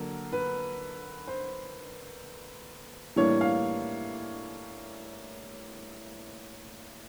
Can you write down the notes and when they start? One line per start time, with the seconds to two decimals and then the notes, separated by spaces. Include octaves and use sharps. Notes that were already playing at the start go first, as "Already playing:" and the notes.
Already playing: D3 F#3 A#3 A#4
0.33 B4
1.27 C5
3.16 A2 E3 G3 A#3 D4 C#5
3.41 F5